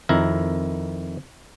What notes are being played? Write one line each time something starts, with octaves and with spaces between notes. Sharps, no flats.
F2 D#3 E4 A#4